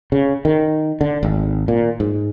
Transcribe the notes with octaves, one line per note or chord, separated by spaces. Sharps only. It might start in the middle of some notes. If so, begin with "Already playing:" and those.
C#3
D#3
D3
G#1
A#2
G#2